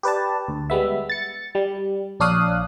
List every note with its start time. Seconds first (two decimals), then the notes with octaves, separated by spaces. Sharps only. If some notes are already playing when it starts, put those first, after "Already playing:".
0.03 G4 B4 D5 A5
0.48 D2
0.70 G3 G#3 B3 E5
1.10 A6 C#7
1.55 G3
2.20 A#1 D4 C#5 F5 D#6 F#6